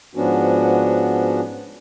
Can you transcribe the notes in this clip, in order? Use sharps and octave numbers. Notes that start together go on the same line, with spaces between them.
G#2 F3 B3 C#4 D4 F#4